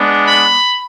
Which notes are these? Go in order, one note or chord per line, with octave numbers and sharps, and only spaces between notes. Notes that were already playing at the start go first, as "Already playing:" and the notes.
Already playing: G#3 B3 D4
B5